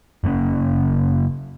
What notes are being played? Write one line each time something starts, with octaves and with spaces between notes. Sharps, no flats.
F#1 C#3 A#3 C#4